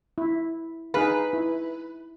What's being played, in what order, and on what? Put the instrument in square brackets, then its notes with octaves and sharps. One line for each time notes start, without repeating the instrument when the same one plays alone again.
[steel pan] E4
[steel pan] D#4 G#4 F5 [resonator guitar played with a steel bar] B4
[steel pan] E4